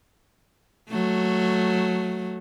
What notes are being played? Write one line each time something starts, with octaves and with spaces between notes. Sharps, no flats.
F#3 A3